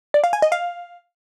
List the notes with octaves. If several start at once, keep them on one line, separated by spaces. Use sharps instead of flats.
D5
F5
G#5
D#5
F5